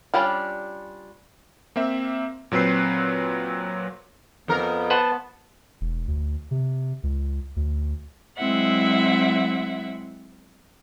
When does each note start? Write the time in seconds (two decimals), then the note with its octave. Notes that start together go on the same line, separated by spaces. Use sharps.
0.14 G3 C#4 D4 F4
1.76 A#3 C4 E5
2.52 A#2 F#3 C4 B4 C7
4.48 F2 B3 A#4
4.90 B4 C5 F#5 A5
5.81 E1
6.08 D2
6.51 C3
7.03 C#2
7.56 D2
8.37 F#3 G#3 C4 E4 E5 F#5